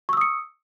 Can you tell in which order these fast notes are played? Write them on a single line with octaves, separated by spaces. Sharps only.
C#6 E6 D#6 C#7